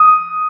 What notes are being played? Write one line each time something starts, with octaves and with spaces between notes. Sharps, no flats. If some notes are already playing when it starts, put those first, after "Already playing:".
Already playing: D#6